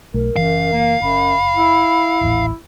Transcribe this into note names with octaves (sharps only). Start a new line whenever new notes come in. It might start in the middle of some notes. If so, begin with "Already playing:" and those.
B1 A3 A#4
F#1 F#2 E3 F5
A#3
F#1 F#2 B5
E4
D#1 A1 A2